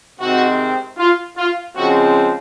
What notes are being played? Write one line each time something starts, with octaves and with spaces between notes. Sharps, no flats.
C3 D#3 G#3 C4 F#4
F4
F4
C#3 F3 G#3 C4 F#4